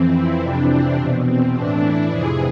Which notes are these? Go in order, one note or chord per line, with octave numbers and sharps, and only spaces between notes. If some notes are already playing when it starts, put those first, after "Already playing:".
Already playing: F2 E3 C4
E4
F2 C3 E3 D4
C4
E2 B2
C4
A2 E3 D4
E4
F2 C3 E3 G#4